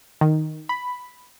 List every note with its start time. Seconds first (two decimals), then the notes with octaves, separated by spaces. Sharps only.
0.21 D#3
0.69 B5